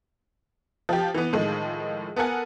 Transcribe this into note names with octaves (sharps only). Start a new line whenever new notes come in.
F3 G4
E3 B3
A2 D#3 F3 G#3
B3 A4 A#4 F#5 G#5